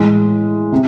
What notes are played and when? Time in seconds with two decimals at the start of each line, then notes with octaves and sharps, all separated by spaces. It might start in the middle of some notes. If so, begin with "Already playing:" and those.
Already playing: A2 E3 G#3
0.72 C3